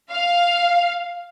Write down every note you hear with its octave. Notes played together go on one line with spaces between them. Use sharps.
F5